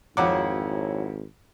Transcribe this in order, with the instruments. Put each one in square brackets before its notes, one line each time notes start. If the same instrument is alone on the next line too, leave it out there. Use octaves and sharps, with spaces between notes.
[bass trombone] G#1 [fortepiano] F2 F#5 D6 [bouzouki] F#3 E4